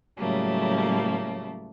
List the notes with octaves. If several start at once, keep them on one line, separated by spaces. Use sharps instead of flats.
A2 C#3 F#3 G3 A3 A#3